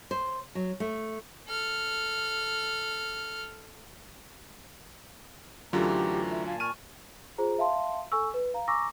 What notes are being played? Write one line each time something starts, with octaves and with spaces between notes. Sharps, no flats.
C5
F#3
A3
A4 F6
F#2 D3 E3 F#3 A3 F4 G4 A#5
E5
A#2 F5 G#5 A5
C#6 F6 D#7
F4 G#4 C5 A#5
E5 F5 A5 C6
A4 G#5 C#6 E6
B4
F5 A#5
G#5 A#5 C#6 D6 E6 A#6